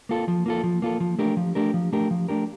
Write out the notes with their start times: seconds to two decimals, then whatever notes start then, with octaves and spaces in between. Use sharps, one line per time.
0.09 A#3 F4 A4
0.28 F3
0.46 A#3 F4 A4
0.63 F3
0.82 A#3 F4 A4
1.00 F3
1.19 A3 D4 G4 A#4
1.37 F3
1.55 A3 D4 G4 A#4
1.74 F3
1.92 A3 D4 G4 A#4
2.11 F3
2.29 A3 D4 G4 A#4